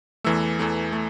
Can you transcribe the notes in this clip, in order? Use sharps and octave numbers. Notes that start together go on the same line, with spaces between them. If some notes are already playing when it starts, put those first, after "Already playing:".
E2 E3 A3 E6
E2 E3 A3
A3